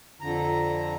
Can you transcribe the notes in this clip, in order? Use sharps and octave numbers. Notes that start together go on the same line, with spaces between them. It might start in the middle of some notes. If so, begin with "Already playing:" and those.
F2 D3 A#5